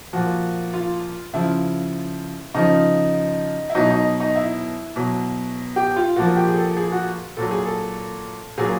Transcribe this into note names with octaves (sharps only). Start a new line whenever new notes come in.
A#2 F3 F#4
F4
C#3 F3 E4
C#3 F3 D#4
E4
B2 F#3 D#4
D#4
D#4
E4
B2 F#3
G4
F4
A#2 F3 F#4
G4
G#4
A4
G#4
F#4
A#2 F#3 A4
G#4
A4
A#2 F#3 G#4